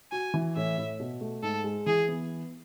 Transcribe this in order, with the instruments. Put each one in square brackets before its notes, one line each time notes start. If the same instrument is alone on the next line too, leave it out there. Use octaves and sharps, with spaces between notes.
[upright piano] F#4 [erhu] G#5
[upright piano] E3
[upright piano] A2 [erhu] E5
[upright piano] A2
B2
A3
[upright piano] G#2 [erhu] A4
[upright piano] G#3
[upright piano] E3 [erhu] G#4
[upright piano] B3